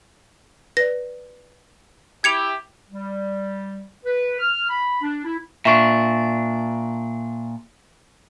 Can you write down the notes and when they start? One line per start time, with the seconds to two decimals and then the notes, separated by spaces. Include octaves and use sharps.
0.77 B4 D5 A#6
2.24 E4 G4 G#6 C#7 F7
2.89 G3
4.05 B4
4.39 F6
4.69 B5
5.02 D4
5.24 E4
5.65 A#2 D4 E5 C#6